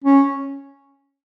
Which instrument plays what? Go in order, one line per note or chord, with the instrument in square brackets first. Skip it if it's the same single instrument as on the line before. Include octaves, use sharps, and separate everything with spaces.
[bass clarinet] C#4